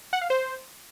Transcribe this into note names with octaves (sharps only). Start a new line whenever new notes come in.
F#5
F5
C5